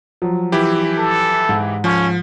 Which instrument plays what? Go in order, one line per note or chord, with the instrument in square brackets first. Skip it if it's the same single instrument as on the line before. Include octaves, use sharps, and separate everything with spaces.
[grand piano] F3 F#3
[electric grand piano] E3 E4 G4
[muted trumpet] A4
[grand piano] G#2
[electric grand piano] F3 [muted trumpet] C#4